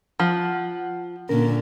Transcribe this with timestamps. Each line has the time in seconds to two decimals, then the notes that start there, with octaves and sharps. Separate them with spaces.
0.20 F3 F#5
1.29 A#2 D3 C#4 A#4